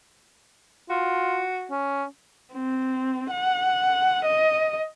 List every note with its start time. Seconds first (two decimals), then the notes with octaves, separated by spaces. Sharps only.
0.90 F4 F#4
1.71 C#4
2.54 C4
3.31 F#5
4.25 D#5